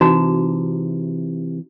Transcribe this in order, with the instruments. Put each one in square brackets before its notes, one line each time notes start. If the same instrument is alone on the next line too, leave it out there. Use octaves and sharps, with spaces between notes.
[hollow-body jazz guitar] C3 [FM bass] E3 [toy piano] D#4 F#4 A#5